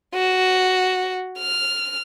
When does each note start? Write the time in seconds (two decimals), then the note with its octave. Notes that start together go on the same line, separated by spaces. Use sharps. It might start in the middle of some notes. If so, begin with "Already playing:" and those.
0.14 F#4
1.39 F6